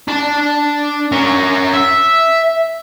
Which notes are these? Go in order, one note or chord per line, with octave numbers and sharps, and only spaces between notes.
D4 A5
C#4 A#4
E5